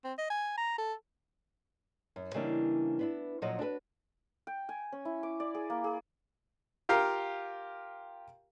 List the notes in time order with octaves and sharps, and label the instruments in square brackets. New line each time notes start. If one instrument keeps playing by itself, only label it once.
[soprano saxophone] C4
D#5
G#5
A#5
A4
[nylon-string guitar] F#2
C#3 E3 G3 A#3 D4 D#4
B3 D4 E4
A#2 F3 F#3 C#5 D#5
D4 F#4 A4 B4
[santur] G5
G#5
C#4
E4
D6
D5
G#4
A#3
G#4
[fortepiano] F4 G4 A#4 F5